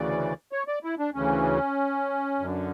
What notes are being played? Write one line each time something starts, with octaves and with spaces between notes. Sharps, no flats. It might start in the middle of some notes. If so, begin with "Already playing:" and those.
Already playing: D2 C#3 E3 D5
C#5
D5
E4
D4
D2 C#3 E3 C#4
F#2 D3